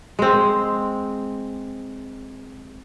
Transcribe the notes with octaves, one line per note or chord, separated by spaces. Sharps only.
G#3 C4